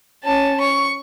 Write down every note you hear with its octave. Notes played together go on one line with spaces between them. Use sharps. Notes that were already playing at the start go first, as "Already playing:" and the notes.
C#4 A5
C#6